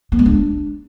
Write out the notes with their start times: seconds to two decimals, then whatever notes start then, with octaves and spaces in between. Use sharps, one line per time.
0.12 B3
0.19 G#3
0.26 D4